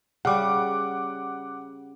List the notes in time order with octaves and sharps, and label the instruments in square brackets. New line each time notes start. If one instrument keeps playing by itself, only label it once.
[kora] C#3 G3 [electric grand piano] F#5 D6